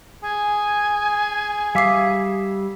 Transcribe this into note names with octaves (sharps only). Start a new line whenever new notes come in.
G#4 G#5
G3 E5 F5 D6 C7